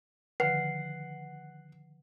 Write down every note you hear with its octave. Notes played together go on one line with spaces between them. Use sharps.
D3 D#3 F3 B4 F#5 C7